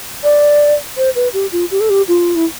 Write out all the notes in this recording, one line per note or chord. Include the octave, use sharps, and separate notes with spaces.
D5
C5
B4
G4
F4
G4
A4
G4
F4
E4